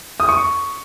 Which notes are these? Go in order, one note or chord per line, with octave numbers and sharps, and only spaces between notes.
D#6
C#6